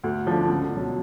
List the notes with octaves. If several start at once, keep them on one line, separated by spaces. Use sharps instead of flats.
D2
D3 F3
C#2
B2 F#3